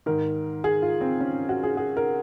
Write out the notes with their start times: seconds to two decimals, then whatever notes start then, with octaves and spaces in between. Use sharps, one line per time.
0.06 G#2 D#3 A#4
0.64 G#4
0.82 F4
1.01 C4
1.20 C#4
1.49 F#4
1.63 G#4
1.77 G#4
1.97 A#4